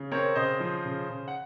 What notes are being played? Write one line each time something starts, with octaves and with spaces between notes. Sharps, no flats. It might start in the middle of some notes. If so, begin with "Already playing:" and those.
Already playing: C#3
C4 A#4 C#5
C#3 C5 D#5
F3
C#3
C#3
F#5